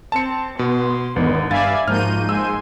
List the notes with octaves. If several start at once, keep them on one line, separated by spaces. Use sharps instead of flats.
C4 A5 C#7
B2 B3 C6
G#1 E2 D3 D#3 B3
G2 G4 D5 E5 F5 G#5 B5 A6
G#2 F3 A#3 F4 F#4 F6 G6 D#7
G#3 G#5 C6 E6